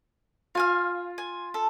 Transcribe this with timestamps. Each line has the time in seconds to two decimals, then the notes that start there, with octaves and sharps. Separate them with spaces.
0.55 F4 F5 G#5 F6
1.18 G#5
1.54 A4